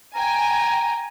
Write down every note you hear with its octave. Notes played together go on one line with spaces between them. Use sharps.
G5 G#5 A#5